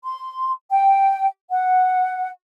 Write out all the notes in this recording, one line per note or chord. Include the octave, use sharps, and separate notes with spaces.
C6
G5
F#5